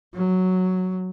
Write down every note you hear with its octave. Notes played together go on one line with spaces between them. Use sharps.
F#3